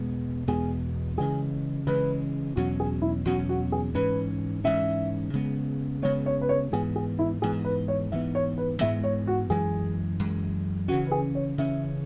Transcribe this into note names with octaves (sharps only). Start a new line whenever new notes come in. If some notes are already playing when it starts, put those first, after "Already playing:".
Already playing: E2 B2 G#3 B3
E2 B2 G#3 B3 G#4
C#3 E3 G#3 G#4
C#3 E3 G#3 B4
E2 B2 F#3 C#4 F#4
G#4
E4
E2 B2 F#3 C#4 F#4
F#4
G#4
G#2 E3 C#4 B4
G#2 E3 C#4 E5
C#3 G#3 B3
C#3 G#3 B3 C#5
C#5
B4
C#5
G#2 E3 B3 G#4
G#4
E4
G#2 E3 B3 G#4
B4
C#5
G#2 E3 G#3 B3 E5
C#5
B4
G#2 E3 G#3 B3 E5
C#5
F#4
F#2 E3 G#3 G#4
F#2 E3 G#3
C#3 E3 C#4 F#4
B4
G#4
C#5
C#3 E3 C#4 E5